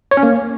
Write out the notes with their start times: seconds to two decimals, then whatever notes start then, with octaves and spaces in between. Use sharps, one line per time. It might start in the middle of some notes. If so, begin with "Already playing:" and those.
0.11 C#5
0.17 C#4
0.23 A#3